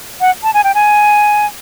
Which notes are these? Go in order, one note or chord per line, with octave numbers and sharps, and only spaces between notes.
F#5
A5
G#5
G5
G#5